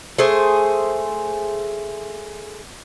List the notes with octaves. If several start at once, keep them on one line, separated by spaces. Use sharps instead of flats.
A3 G#4 C5